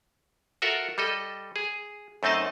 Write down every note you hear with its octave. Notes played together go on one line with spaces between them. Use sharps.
F4 F#4 A4 A#4 E5 F#5
G3 A4 D#5
G#4
F#2 A3 C4 D#4 D#5 A5